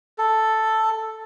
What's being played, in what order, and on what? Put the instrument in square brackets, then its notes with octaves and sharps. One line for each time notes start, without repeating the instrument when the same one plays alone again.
[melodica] A4